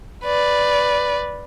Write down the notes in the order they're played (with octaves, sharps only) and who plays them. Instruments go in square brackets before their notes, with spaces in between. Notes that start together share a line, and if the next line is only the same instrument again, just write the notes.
[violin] B4 D5